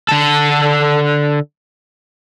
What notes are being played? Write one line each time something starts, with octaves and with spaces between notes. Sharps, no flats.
D3 A4